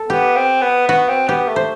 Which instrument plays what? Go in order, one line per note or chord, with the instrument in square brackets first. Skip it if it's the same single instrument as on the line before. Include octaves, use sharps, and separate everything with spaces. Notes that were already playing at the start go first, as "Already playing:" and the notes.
Already playing: [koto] A4
[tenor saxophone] B3 [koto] G4
[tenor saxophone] C4
B3
[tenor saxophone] B3 [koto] F#4
[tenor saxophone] C4
[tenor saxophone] B3 [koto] G4
[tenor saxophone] A3
[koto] C5